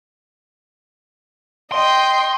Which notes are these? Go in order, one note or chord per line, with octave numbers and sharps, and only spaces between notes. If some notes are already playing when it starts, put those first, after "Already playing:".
D#5 G5 C6